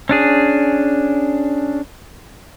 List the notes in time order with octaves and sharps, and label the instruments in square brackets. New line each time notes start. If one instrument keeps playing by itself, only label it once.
[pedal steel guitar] C#4 D4 G#4